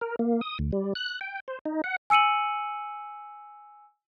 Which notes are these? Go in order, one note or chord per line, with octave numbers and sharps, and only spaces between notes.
A#4
A#3
D#6
D2
G3
F#6
G5
C5
D#4
F#5
G#5 E6 C#7 D#7 F#7